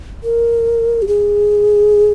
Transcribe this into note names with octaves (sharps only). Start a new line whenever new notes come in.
A#4
G4
G#4